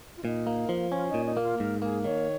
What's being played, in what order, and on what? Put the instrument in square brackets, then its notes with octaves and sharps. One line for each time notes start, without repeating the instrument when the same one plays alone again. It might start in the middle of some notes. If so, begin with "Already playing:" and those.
[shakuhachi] F4
[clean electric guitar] A#2 [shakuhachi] D#4
[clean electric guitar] A#3
F3
[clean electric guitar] C#4 [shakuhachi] F4
[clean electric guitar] A#2 [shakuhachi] D#4
[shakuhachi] D#4
[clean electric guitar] A#3
[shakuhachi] F4
[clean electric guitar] G#2 [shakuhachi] A#4
[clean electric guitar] A#3 [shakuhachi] G#4
[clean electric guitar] D#3 [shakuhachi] C#5